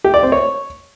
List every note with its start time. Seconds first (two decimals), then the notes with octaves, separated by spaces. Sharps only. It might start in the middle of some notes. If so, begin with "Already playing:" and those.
0.04 G4
0.14 D5
0.23 C4
0.32 C#5